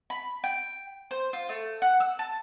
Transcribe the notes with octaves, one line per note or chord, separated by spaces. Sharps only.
B5
G5
C5
F4
A3
F#5
E6
A5